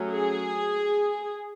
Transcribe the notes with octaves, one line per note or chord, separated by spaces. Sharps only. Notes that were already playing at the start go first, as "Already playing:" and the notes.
Already playing: F#3 A3 C#4
G#4